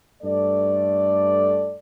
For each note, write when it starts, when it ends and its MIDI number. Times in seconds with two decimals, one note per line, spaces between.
0.22 1.77 43
0.22 1.77 57
0.22 1.77 69
0.22 1.77 74